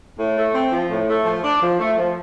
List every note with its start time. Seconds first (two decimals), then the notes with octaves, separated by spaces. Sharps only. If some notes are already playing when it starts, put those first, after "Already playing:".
0.19 A2
0.36 A3
0.54 C4
0.72 F3
0.90 A2
1.08 A3
1.26 F3
1.44 D4
1.62 F3
1.79 A3
1.97 F3